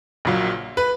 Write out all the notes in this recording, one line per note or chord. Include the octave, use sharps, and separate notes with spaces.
A#1 A#2 F#3
B4